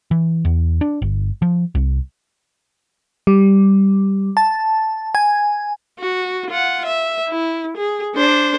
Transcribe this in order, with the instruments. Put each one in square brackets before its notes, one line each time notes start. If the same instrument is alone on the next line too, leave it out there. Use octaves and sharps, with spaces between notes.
[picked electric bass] E3
E2
D4
G1
F3
C2
[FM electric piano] G3
A5
G#5
[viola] F#4
F4 F#5
E5
E4
G#4
D4 C5